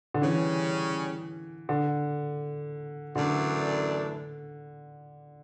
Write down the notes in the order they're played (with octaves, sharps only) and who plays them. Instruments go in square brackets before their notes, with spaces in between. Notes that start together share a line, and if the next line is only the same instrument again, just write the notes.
[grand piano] D3
[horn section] C#3 G3 C#4 [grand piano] E3
[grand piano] D3
[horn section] F#2 E3 A3 D4 [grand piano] D3